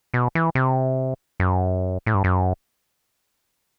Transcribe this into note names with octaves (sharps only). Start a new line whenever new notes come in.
B2
E3
C3
F#2
A2
G2
F#2